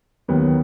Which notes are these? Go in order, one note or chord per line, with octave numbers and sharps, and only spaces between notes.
D#2 D#3 F#3 B3